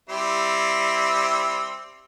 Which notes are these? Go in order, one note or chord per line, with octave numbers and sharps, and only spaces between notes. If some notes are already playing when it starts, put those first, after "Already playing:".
G3 C4 E4